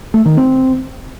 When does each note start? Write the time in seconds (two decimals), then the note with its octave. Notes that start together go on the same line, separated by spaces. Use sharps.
0.14 A3
0.25 D#3
0.37 C4